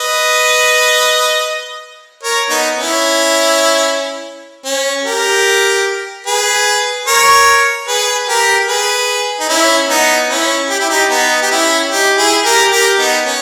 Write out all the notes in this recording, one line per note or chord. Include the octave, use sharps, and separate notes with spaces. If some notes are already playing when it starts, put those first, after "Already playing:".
Already playing: B4 D#5
A#4 C#5
B3 D#4
C#4 E4
C#4
G4 A#4
G#4 B4
A#4 C#5
G#4 B4
G4 A#4
G#4 B4
D#4
C#4 E4
B3 D#4
C#4 E4
G4
E4
D#4 G4
B3 D#4
G4
C#4 E4
D#4 G4
E4 G#4
G4 A#4
G4 A#4
B3 D#4
C#4